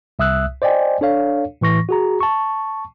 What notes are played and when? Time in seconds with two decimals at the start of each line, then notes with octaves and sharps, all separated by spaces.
0.19 C2 E5 D#6 E6 F#6
0.62 C5 D5 D#5 G5 G#5
1.01 D4 A4 C#5 F5
1.61 A2 E3 C#6 A#6
1.89 F#4 G#4 A#5
2.20 A5 C#6